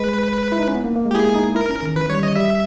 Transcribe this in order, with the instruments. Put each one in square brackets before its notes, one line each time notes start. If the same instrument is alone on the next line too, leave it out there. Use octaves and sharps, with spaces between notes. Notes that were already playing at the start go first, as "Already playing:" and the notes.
Already playing: [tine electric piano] G#3 [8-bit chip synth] B4
[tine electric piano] E4
D#4
C#4
B3
A#3
A#3
G#3
[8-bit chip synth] G4
[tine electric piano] E4 [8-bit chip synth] G#4
[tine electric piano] D#4
[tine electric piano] E4 [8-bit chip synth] A#4
[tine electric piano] C#4
D#3
[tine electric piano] E3 [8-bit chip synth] B4
[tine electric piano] G3 [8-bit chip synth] C#5
[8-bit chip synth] D#5
[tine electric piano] G3 [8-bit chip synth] E5